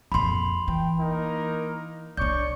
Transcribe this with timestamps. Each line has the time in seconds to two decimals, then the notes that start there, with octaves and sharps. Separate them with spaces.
0.12 A#1 F2 B5 C6
0.68 E3 G5
1.00 A#3 D#4 A#4
2.17 B1 D4 C#5 D5 C#6 G6